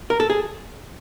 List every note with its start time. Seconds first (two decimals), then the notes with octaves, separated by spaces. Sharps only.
0.10 A#4
0.20 A4
0.30 G#4